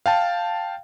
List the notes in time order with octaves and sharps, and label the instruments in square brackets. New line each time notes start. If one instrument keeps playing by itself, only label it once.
[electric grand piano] F5 G5 A5